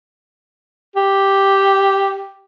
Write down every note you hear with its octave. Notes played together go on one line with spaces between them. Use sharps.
G4